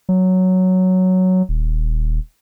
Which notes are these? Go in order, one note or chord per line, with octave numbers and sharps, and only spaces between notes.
F#3
D#1